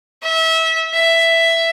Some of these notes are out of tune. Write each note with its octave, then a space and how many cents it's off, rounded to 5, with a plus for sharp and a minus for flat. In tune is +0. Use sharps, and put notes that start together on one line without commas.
E5 -25
E5 +5